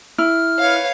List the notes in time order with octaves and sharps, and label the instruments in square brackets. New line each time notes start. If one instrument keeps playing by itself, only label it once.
[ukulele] E4 [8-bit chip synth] F6
[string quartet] B4 C#5 F5